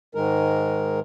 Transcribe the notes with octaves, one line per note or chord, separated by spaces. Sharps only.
G#2 D#3 G#3 A#4